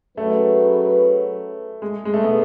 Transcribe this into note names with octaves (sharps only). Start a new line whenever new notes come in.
F#3 A3 C#4 G#4 B4
G#3
G#3
A3
B3